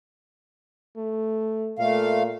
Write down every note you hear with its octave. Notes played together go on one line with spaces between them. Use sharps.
A3
A#2 A3 F5